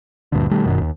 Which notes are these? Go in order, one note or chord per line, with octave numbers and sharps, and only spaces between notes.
D2 G2 A#2 D3
B2 D#3 G3 A3
G1 F#2 B2 D#3
D#2